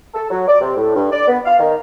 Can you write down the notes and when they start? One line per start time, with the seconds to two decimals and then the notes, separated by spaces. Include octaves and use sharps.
0.15 A4
0.30 F#3
0.48 D5
0.61 C3
0.77 A2
0.96 G2
1.12 D5
1.27 B3
1.46 F5
1.59 D#3